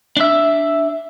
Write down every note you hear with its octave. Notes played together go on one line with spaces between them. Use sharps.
D4 E5